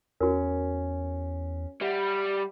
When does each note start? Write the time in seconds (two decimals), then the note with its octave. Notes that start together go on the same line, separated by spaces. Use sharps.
0.20 E2 C#4 F#4 A#4
1.81 G3 E5 F#5